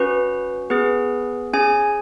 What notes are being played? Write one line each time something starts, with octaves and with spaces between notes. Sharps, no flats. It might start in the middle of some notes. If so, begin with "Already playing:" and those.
Already playing: C#4 F#4 B4
B3 G#4 B4
C#4 G#4 G#5